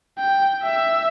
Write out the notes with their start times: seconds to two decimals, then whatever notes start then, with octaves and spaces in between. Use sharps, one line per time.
0.18 G5
0.63 E5 E6